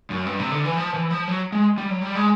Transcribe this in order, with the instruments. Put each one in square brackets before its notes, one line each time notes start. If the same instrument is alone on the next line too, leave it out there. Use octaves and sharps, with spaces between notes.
[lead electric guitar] F#2
G2
C3
D3
E3
F3
E3
F3
F#3
G#3
G3
F#3
G3
G#3